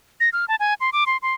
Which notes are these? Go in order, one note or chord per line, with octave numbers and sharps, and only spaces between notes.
A#6
F6
A5
G#5
C6
D6
C6
C6